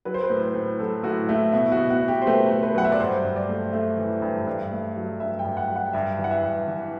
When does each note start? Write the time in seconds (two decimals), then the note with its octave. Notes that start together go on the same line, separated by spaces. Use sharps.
0.05 F#3 B4
0.14 C5
0.23 B4
0.30 A2
0.42 C5
0.54 A2
0.80 F#3 A4
1.03 A2 F#4
1.29 A3 E4
1.53 B2 E4
1.72 F#4
1.77 B2
1.90 F#4
2.02 B2
2.08 G4
2.22 C5
2.27 A3 B4
2.51 A3
2.63 B4
2.75 F#3 F#5
2.85 E5
2.92 D5
3.00 G2 C5
3.24 G2
3.36 D5
3.49 A3
3.73 A3
3.98 E3
4.22 G2
4.47 G2
4.72 A3
4.96 F#3
5.20 G2 E5
5.39 G5
5.44 G2
5.57 F#5
5.69 F#3
5.76 F#5
5.93 G2 E5
6.18 E3
6.24 F#5
6.31 E5
6.43 G2
6.67 E3